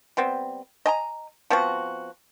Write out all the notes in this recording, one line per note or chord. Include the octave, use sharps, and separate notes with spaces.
G3 B3 C4
D#5 G#5 A#5
F3 B3 C4 F#4